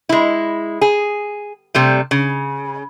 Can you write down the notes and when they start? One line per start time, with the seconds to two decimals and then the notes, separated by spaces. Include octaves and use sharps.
0.09 G#3 E4
0.81 G#4
1.75 C3 G3 A3
2.11 C#3